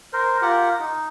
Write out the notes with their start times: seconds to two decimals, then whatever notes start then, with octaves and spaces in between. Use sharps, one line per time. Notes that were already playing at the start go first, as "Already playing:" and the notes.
0.13 A#4 C5
0.42 F4 G4 A#4 F#5
0.79 D#4